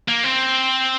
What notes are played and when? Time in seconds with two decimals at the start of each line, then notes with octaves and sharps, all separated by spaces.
0.09 A#3
0.24 C4